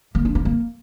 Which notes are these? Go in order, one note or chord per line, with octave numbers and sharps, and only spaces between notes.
A#3
D4
A#3
A#3